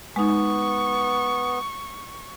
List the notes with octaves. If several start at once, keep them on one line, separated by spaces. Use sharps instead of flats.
G#3 B3 D#4 C#6